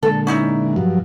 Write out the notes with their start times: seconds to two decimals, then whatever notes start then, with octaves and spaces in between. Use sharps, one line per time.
0.03 A#2 D3 G#3 A4
0.27 C#4 D#4 E4
0.76 G2 F3 F#3